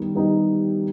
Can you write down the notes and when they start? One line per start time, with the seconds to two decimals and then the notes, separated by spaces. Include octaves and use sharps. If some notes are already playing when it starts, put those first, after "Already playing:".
Already playing: D#3 G3 B3 D#4
0.15 D#3 G3 B3 D#4 G4